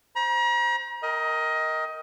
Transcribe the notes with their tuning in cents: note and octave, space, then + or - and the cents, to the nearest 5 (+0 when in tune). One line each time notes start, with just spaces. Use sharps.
C5 +0 A#5 +40
A#4 -5 D#5 +20 G5 -5